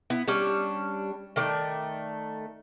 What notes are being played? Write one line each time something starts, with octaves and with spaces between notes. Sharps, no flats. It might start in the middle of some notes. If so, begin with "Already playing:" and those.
B3 E4
G3 C#4 D4 D5
D#3 A3 D5